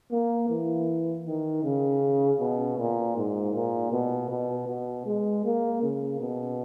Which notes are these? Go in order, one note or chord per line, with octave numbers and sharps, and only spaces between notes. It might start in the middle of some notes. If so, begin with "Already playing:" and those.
A#3
E3
D#3
C#3
B2
A#2
G#2
A#2
B2
B2
B2
G#3
A#3
C#3
B2